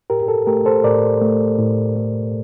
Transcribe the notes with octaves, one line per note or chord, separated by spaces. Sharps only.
A2 G4 A#4
G4
A4
A3 G4 A#4
A4 C5
A2 A#4 D5
A3
A2
A3